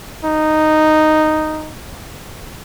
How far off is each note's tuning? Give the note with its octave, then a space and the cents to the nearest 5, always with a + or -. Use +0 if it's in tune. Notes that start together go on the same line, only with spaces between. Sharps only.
D#4 -5